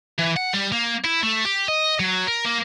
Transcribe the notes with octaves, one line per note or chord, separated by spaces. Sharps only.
E3
F#5
G3
A#3
E4
A3
G4
D#5
F#3
A#4
A#3